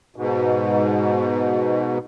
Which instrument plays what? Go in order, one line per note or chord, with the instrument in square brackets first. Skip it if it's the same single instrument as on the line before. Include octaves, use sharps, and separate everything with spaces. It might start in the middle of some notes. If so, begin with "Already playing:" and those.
[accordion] G#2 B2